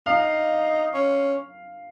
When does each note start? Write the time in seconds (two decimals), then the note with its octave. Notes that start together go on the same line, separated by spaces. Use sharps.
0.06 D#4 F5
0.94 C#4